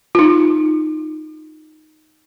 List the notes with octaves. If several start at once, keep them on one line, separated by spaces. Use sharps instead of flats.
D#4 F4